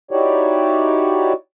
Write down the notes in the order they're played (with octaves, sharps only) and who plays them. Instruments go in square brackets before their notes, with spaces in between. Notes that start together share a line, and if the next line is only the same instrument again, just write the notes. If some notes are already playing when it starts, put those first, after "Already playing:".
[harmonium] D#4 E4 F#4 G4 C#5 D5